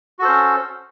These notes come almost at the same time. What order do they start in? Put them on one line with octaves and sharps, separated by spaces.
F#4 A4 C5 C#4